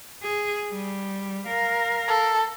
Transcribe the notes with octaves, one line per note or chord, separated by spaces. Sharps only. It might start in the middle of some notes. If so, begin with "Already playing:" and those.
G#4
G3
A#4 F5
A4